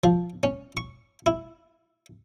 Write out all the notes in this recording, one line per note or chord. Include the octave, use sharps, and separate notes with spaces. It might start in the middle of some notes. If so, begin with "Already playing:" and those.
F3
C#4
C#6
E4